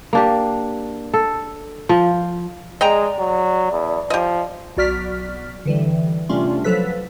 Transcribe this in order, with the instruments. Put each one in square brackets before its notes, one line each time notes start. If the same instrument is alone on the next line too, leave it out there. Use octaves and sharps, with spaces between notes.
[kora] A#3 D4 G4
A4
F3
[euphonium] G#3 [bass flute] D5 [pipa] D#5 G5 A#5
[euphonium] F#3
E2
[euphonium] F3 [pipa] G4 D#5
[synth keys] B1 F#4 D5 F6 B6
D3 E3 G3
C3 G3 A3 C#4 D4 F4
F3 F#3 A4 B4 B6